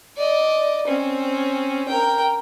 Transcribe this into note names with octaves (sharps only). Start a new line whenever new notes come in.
D5 D#5
C4 C#4
A#4 G5